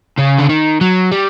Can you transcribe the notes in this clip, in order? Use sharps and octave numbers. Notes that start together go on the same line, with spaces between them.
C#3
D3
D#3
F#3
G3